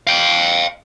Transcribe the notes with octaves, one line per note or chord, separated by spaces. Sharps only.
F5 G5